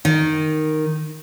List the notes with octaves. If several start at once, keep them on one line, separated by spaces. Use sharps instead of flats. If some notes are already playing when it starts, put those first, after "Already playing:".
D#3